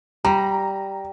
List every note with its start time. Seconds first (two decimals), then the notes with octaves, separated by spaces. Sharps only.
0.25 G3 A#5